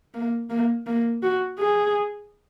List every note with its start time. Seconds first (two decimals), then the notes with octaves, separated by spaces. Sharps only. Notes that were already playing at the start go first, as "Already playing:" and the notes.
0.14 A#3
0.50 A#3
0.87 A#3
1.23 F#4
1.59 G#4